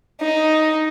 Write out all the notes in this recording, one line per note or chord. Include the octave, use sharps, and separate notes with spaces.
D#4